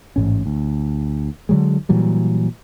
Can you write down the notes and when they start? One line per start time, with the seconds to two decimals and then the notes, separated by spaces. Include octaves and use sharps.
0.16 A1 G#2 C#4
0.46 D2
1.49 D3 F#3 G#3
1.89 A#2 E3 F#3 G3